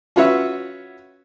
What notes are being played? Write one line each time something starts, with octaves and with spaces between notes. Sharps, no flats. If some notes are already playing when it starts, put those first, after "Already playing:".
C#4 F4 F#4 B4 C#5 E5